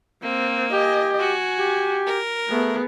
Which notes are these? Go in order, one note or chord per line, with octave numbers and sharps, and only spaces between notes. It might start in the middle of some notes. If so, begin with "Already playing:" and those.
A#3 C4
G4 D#5 G#5
F#4 G#5
G4
A#4
A3 B3 G#4